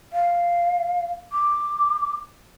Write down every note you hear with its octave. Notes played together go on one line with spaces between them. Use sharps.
F5
D6